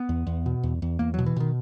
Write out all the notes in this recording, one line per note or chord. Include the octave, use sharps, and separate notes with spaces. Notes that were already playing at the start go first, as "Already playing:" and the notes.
Already playing: B3
E2
E2
B2
E2
E2
E2 A#3
F#3
B2
E3
B2 D#3